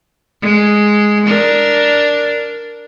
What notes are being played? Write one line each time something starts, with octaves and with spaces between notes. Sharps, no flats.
G#3
D4 A#4